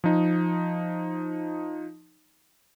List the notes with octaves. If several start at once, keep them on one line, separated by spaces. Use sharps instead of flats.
F3 D#4